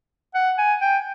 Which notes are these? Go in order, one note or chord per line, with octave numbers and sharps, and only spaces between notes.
F#5
G#5
G5